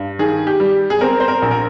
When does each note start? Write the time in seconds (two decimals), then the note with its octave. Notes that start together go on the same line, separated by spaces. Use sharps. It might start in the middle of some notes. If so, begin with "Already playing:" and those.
Already playing: G2
0.19 D#3 G#4
0.47 G4
0.60 G3
0.90 G#4
1.01 C4 A#4
1.20 C5
1.28 A#4
1.42 A#1
1.51 A#4